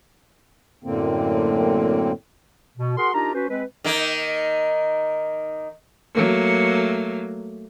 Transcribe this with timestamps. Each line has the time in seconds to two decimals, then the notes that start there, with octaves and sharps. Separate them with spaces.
0.84 F#2 A2 D3 A#3 C4
2.78 B2
2.98 F#4 G#4 A#4 F#5 C6
3.14 D4 D#4 F4 G4 A#4 A#5
3.34 C#4 F#4 B4 C5
3.49 G#3 C4 B4
3.84 D#3 A#3 D#4
6.14 F#3 A3 A#3